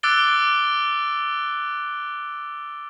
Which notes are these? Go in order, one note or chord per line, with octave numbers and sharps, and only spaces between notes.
D6 E6 F#6 A6 D7 G7